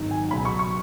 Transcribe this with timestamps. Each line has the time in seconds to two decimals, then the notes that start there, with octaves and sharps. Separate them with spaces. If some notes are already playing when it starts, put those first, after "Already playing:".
Already playing: G#1 G#2 D#3 F#3
0.11 G#5
0.31 C#2 B2 F#3 B5
0.45 C#6
0.59 C#6